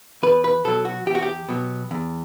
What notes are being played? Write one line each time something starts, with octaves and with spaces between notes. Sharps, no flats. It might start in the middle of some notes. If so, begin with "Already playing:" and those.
E2 B4
B4
B2 F#3 A4
F#4
E2 G4
F#4
G4
B2 F#3
E2